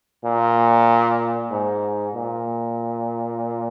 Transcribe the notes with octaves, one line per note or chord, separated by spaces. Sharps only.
A#2
G#2
A#2